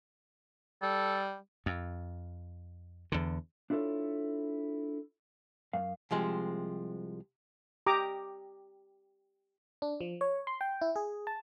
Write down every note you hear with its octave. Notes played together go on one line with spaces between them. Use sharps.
G3 A4
F2
E2 D3
D4 E4 F4 A4 C#5
F#2 F5
C2 F3 G#3 C4
G4 A#5 D6 D#6
D4
F3
C#5
C6
G5
E4
G#4
A5